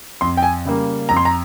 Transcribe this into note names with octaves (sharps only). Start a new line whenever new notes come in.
F2 C6
G5
G#5
C#3 G3 A#3
F2 A#5
C6
A#5